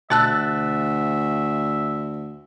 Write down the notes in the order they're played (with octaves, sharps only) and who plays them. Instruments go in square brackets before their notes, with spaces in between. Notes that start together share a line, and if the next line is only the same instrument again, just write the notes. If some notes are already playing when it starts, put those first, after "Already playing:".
[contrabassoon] D2 [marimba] B2 A5 E6 [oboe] E5 [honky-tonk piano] F#6 A6